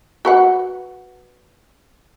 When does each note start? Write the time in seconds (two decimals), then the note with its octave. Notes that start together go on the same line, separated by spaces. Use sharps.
0.25 F#4 B4 F#5